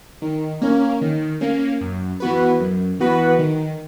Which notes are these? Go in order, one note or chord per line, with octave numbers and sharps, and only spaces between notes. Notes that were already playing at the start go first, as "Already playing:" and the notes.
D#3
A#3 C#4
D#3
A#3 C#4
F#2
E3 B3 F#4 B4
F#2
E3 B3 F#4 B4
D#3